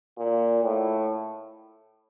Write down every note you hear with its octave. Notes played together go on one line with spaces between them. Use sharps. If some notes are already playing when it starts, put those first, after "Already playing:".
A#2
A2